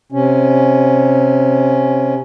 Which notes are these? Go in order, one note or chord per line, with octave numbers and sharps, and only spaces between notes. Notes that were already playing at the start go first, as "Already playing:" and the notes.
C3 C#4